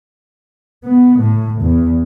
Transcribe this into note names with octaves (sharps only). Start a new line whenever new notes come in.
B3
A2
E2